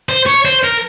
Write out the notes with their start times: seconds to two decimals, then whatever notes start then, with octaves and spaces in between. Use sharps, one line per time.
0.09 C5
0.26 C#5
0.45 C5
0.63 A#4